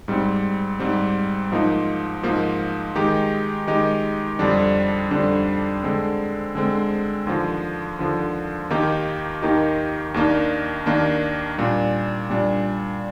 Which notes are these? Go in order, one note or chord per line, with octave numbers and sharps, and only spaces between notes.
G#2 G3 C4
G#2 G3 C4
G#2 F3 A#3 D#4
G#2 F3 A#3 D#4
D#3 G#3 D#4 G4
D#3 G#3 D#4 G4
F2 D3 G3 D4
F2 D3 G3 D4
D3 G#3 C4
D3 G#3 C4
D#2 D3 F3
D#2 D3 F3
D#2 D#3 A#3 D#4 G4
D#2 D#3 A#3 D#4 G4
D#2 D#3 A#3 D4
D#2 D#3 A#3 D4
A#2 G3 D4
A#2 G3 D4